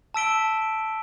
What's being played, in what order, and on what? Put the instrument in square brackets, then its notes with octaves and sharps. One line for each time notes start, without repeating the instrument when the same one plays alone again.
[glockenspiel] A5 E6 B6 D7 G7